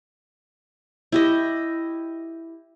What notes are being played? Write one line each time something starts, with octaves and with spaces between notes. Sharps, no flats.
E4 G4 D#5